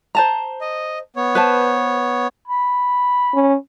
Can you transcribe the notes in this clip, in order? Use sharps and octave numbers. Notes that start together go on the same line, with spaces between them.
C5 A5 A#5
D#5
B3 C#5
B4 C5 A5
B5
C#4